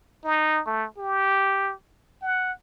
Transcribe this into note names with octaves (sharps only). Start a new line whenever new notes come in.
D#4
A3
G4
F#5